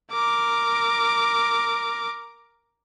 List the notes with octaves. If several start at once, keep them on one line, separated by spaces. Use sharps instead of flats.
A#4 D6